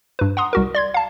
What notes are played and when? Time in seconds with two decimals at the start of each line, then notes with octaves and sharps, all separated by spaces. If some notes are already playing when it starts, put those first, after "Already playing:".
0.19 G2 B4
0.37 F#5 A#5 C6 D#6
0.53 C2 F#4 A#4
0.75 D5 C6 G#6
0.94 F5 A5